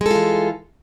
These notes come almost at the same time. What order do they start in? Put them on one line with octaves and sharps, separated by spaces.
G#3 A4 F4 E3